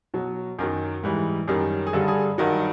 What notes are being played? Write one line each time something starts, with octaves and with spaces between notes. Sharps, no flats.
B2 F#3
F#2 D#3 F#3
G#2 E3 G3
F#2 D#3 G3
G#4
G2 D3 G3 A4
G#4
G2 D#3 F#3 F#4